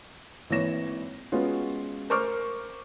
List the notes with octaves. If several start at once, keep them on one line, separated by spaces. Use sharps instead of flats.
G#1 E3 A#3 C#5 A#6 E7
G#3 B3 C#4 F4 F#4
A#4 C5 C#6 D6 F6